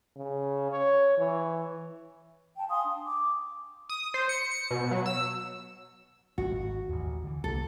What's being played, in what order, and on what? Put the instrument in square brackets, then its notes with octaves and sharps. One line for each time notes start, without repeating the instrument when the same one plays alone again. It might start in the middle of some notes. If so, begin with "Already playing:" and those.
[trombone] C#3
C#5
E3
[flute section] G5 A5
F5 G#5 C6 D#6
D4
D6
[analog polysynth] D#6
C5
C#7
C#7
B2
F#3
E6
[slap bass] G#1 [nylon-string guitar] F#4
[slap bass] A1 D#2
D3 E3
[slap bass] C2 A#3 [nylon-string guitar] A4